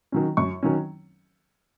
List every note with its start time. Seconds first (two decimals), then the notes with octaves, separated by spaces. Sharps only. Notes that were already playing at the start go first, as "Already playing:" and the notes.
0.12 D#3 F#3 C#4
0.37 F#2 C#6
0.63 D#3 F#3 C#4